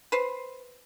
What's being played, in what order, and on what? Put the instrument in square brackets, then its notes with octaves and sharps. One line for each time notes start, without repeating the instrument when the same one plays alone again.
[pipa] B4 C5